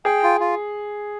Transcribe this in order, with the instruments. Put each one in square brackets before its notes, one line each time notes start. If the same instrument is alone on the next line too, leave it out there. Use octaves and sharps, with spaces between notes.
[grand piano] G#4 [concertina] G5
[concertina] F4
F4